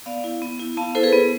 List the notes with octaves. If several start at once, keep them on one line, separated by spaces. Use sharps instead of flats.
B3 D5 F5
E4
B3
E4
B3 F5 A5
E4 A4 C5
G#4 B4
B3